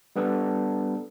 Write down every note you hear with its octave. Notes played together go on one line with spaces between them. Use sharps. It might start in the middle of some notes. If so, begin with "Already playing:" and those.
G3 B3 D4 A4